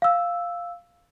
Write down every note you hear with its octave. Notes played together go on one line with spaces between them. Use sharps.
F5 E6